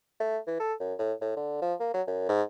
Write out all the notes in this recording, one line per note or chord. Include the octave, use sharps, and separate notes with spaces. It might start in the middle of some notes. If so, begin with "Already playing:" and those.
A3
E3
A4
F#2
A2
A2
D3
F3
A#3
F#3
F#2
G#2